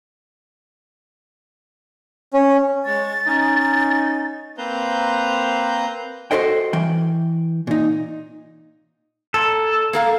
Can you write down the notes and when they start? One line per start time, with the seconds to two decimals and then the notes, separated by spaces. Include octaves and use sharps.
2.34 C#4
2.85 G#3 C#5 A6
3.27 C#4 D#4
4.58 A#3 C4 B4 C5 A#5 G6
6.31 F#4 G#4 A4 C5 D#5 G5
6.73 E3 G5
7.67 A#2 D#4
9.34 A#2 A4
9.93 A#3 A4 F5